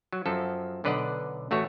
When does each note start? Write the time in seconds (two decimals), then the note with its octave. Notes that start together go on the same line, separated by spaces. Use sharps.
0.13 F#3
0.26 F#2 F3 A4
0.84 B1 D3 B4 D5 D#5 F#5
1.51 A1 A3 F#4 C#5